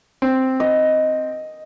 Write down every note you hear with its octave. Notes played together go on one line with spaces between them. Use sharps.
C4
D#5